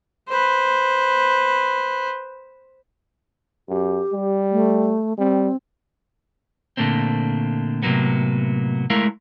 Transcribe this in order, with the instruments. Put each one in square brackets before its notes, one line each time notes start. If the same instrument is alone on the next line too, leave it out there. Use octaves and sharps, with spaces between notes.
[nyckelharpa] B4 C5
[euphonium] F#2 [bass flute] G4
[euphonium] G3
[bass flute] A3
[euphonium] G3 [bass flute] C4
[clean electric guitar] A#2 D3 A3 A#3 C4
A2 C3 E3 F#3 A#3 B3
G#3 A3 E4 A#4 F5